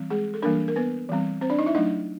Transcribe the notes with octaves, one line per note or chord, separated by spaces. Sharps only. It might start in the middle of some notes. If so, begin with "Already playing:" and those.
Already playing: E3 G3 C4
G#3 G#4
A4
E3 G3 A#3 D4 A#4
A#4
B3 B4
E3 G3 C4
C4 C5
D4 D5
D#4 D#5
E4 E5
F#3 A3 D4 D#4 D#5